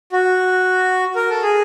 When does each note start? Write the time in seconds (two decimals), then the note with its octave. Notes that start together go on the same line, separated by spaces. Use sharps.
0.12 F#4
1.16 A#4
1.30 A4
1.43 G#4